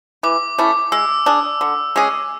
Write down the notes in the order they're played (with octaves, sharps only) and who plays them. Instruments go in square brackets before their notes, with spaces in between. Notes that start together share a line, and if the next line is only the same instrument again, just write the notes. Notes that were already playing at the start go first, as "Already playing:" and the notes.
[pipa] E3 [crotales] D6
[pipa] A3 C#4 E4
[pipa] G#3 [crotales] E6
[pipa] D4 G#4
D3
G#3 C#4 G#4